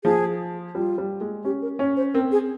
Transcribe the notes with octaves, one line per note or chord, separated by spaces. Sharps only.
F3 G#4
G3 F4
G3
G#3
C#4 G4
A#4
C#4 C#5
C5
C4 A#4
G#4